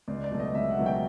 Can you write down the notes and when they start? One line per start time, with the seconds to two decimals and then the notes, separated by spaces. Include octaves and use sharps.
0.08 C#2 D5
0.24 D5
0.31 B2 F#3 A3
0.40 D#5
0.55 C#2 E5
0.70 F#5
0.77 B2 F#3 A3
0.86 G5